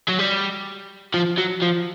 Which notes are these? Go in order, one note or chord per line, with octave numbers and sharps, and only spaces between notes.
F#3
G3
F3
F#3
F3